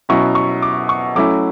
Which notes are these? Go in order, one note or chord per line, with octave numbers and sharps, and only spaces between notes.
B2 F#3 C#4 E4 C#6
C#6
D6
C#6
F#3 A3 C#4 E4 D6